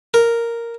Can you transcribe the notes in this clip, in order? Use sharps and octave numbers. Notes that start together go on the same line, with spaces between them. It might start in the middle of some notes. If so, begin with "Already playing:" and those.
A#4